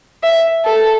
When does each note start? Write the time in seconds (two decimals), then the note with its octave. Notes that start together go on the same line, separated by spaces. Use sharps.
0.23 E5
0.65 A4